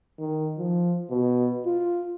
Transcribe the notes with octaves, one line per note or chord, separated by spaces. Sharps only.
D#3
F3
B2
F4